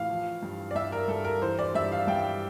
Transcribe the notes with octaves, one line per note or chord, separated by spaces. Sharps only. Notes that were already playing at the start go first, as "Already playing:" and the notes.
Already playing: A2 E3 F5
F3
G2
D5
G2 E5
A#4
G2 A4
A#4
E3 C5
D5
G2 E5
F5
G2 G5